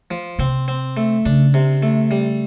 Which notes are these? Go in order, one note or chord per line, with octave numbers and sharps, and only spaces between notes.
F3
C3 C4
C4
A3
C#3 D4
C3
A3
G3